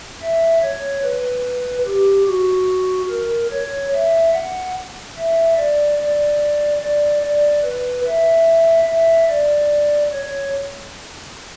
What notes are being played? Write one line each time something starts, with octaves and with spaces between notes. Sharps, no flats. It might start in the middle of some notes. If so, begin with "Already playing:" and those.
E5
C#5
B4
G4
F#4
A#4
C#5
E5
F#5
E5
D5
D5
D5
D5
B4
E5
E5
D5
C#5